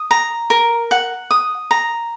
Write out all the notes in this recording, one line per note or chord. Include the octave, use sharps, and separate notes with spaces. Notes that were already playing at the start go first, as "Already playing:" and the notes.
Already playing: D#6
A#5
A#4
F#5
D#6
A#5